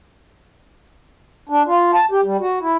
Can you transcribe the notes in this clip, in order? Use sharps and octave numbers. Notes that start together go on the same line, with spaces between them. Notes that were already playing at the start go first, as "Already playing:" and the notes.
D4
F4
A5
G4
G3
F#4
E4